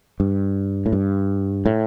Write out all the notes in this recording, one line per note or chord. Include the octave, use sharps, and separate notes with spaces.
G2
A2
G2
A2